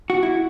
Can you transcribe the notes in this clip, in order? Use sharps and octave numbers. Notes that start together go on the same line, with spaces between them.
F#4
E4